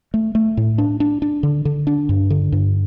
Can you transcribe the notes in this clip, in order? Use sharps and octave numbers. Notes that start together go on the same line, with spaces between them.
A3
A3
A2
D4
D4
D4
D3
D3
D4
G2
D3
G2